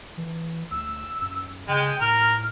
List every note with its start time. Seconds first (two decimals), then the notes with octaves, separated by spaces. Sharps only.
0.18 E3
0.71 D2 E6
1.22 F#2
1.69 C#3 G#3 G5
2.01 A2 A#4 F6